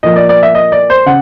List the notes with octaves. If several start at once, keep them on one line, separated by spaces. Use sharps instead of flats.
A#2 F3 A#3 D#5
D5
D5
E5
D#5
D5
C5
C#3 F#5